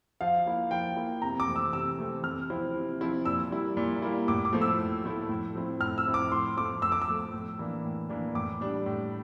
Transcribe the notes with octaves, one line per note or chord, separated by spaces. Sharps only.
F3 F5
A#3 E4
F3 G5
A#3 E4
C3 A#5
D6
E3 A3 C4
E6
C3 E6
E3 A3 C4
C3 F6
F3 C4 E4
C3
F3 C4 E4
A#2 E6
G3 A#3 E4
A#2
G3 A#3 E4
A2 D6
D6
F3 A3 E4
E6
A2
F3 A3 E4
A2
F3 C4 E4
A2 F6
E6
F3 C4 E4
D6
A2 C6
F3 A3 D6
A2 E6
D6
E6
F3 A3
A2
E3 A#3 D4
A2
E3 A#3 D4
A2 D6
G3 D4
A2